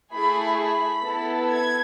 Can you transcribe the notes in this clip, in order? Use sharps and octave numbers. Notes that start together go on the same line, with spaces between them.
A3 E4 G#4 B5
B5
B3 E4 A4
G#6